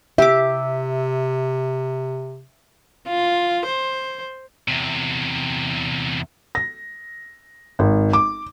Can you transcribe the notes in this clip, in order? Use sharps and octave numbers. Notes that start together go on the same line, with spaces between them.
C3 G4 E5 D6
F4
C5
E2 C3
A#6
G#1
D6